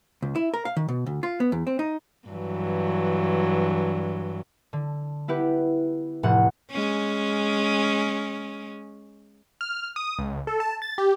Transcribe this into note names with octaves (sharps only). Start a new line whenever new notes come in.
C#2
E4
A#4
F5
D#3
B2
D2
F4
B3
E2
C4
D#4
G2 E3 F#3
D3
B3 E4 G4 B4
F1 A2 C3 F#5
G#3 C#4
F6
D#6
C#2
A4
A5
A6
G4